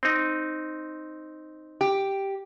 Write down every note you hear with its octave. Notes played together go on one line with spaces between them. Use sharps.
C4 D#4
G4